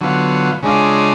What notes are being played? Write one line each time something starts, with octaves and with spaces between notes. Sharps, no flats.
D3 F#3 B3 F4
C#3 G#3 D4 F4